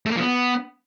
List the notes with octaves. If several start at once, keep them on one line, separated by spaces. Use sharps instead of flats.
A3
A#3
F3
B3